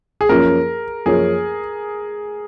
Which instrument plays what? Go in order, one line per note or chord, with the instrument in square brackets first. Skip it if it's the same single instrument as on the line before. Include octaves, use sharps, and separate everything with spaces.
[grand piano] G#4
[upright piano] F#2 F3 A#3 C#4 [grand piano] A#4
[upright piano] F#2 F3 A#3 C#4 [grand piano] G#4